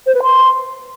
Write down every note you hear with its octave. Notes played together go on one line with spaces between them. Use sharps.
C5
B4
C6